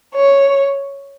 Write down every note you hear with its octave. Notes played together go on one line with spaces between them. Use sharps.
C#5